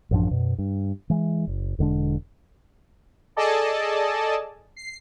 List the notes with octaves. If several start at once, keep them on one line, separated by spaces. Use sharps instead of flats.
A1 F#2 F3 D4
F#2 B2
G2
E3 G#3
F#1
E1 D3 G#3 D4
G#4 A4 D5 D#5 G#5 A5
C7